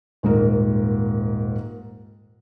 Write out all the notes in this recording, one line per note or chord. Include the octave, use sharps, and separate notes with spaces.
D#1 G#2 A#4